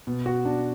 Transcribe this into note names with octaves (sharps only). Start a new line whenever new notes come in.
B2
F#4
D4